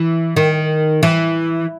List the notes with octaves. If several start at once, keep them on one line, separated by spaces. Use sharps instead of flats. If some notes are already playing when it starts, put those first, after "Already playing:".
Already playing: E3
D#3
E3